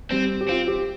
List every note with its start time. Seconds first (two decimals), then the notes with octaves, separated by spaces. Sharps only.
0.12 G3 C4
0.41 G4
0.49 C4 F4
0.68 G4